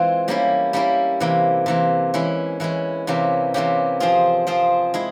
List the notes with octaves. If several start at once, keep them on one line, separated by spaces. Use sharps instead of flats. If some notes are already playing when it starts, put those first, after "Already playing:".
Already playing: E3 G#3 C4 F4
G3 A#3 C#4 E4
G3 A#3 C#4 E4
C3 E3 A#3
C3 E3 A#3
E3 G#3 C#4 E4
E3 G#3 C#4 E4
C3 E3 A#3 C#4 G4
C3 E3 A#3 C#4 G4
F3 C4 F4 G#4
F3 C4 F4 G#4
G#3 E4 G#4